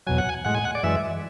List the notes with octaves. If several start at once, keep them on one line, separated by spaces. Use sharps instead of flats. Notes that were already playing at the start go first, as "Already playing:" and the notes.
E2 B2 F#3 G#5
F#5
G#5
A2 G#3 F#5
G#5
F#5
D5
F#2 E3 G#3 E5